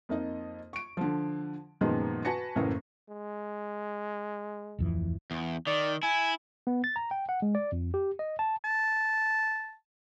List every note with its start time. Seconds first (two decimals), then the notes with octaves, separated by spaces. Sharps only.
0.09 F2 A#3 D#4 D#5
0.73 C#6 D7
0.97 D3 F3
1.81 F#2 A#2 D#3 F3 G#3 B3
2.25 F#4 B4 G#5 A5 A#6 C#7
2.56 F#1 A2 C#3 E3 A#3
3.09 G#3
4.79 D1 F2 E3
5.31 E2
5.67 D#3 D5
6.03 E4 G#5
6.67 B3
6.84 A6
6.96 A#5
7.11 G5
7.29 F#5
7.42 G#3
7.55 D5
7.72 F2
7.94 G4
8.19 D#5
8.39 A5
8.64 A5